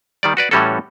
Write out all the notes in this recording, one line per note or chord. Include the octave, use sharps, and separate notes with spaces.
D#3 G3 D5
F#4 B4 D5
A2 E3 G3 C#4 F#4 A4